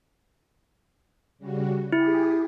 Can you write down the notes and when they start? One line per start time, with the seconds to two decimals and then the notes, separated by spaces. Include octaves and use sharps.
1.38 C#3 G3 F#4
1.92 E4 G4 G#4